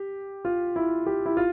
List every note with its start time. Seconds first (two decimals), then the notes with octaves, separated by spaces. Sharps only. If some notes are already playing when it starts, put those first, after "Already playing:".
Already playing: G4
0.45 F4
0.76 E4
1.06 G4
1.26 E4
1.37 F4